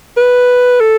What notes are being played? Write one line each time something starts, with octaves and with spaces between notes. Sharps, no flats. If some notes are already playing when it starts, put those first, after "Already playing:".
B4
A4